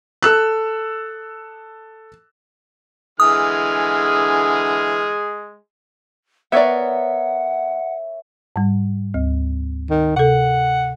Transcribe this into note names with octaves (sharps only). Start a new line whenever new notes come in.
A4 E6 F#6
D3 E3 G#3 G#4 D#6 F6
B3 A#4 C#5 D5 E5 F#5
G#2 G3
D2
D#3
C3 A4 F#5